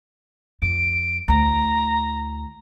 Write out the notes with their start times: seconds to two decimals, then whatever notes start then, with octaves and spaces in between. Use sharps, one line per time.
0.62 F2 D7
1.28 D2 E4 A#5